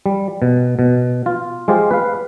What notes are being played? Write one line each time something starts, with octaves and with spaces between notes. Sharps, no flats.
G3
B2
B2
F4
G#3 F4 G4 C5 F5
B4 F5